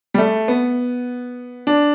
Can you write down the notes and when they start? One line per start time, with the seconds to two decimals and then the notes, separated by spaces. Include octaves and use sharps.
0.14 G3
0.18 A3
0.48 B3
1.67 D4